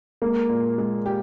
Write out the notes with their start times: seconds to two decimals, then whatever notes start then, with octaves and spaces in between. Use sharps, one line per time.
0.22 G#3 A#3
0.49 A#2
0.78 G#3
1.06 G4